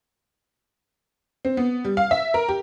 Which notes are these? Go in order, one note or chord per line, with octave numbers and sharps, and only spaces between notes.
C4
B3
G3
F5
E5
A#4
G4